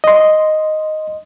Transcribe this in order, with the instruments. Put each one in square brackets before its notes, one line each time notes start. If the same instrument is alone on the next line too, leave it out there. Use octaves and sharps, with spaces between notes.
[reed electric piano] D#5 C6